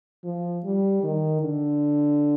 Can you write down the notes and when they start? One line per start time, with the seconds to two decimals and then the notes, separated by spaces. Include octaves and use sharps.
0.24 F3
0.64 G3
1.03 D#3
1.41 D3